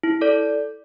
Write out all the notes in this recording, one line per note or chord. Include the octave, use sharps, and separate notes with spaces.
E4
A4 D5